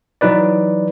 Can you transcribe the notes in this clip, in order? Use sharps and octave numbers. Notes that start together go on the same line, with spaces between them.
E3 F#3 D#4 B4 D5